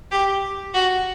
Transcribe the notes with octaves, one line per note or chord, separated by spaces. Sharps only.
G4
F#4